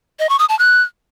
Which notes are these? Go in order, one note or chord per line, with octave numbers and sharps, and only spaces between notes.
D#5
C#6
D#6
A5
F#6